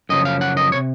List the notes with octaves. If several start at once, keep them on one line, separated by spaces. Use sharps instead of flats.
F#2 C#3 F3 D#5
F5
F#5
D#5
C3 C#5